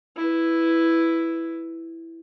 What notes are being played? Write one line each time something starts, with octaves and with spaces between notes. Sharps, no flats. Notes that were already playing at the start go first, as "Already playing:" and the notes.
E4 B4